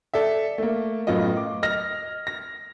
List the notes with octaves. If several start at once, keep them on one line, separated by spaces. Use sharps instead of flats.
A4 D5 E5
A3 A#3
F#2 A2 B3 F4 D#5
D6
D#5 F6 A#6
A#6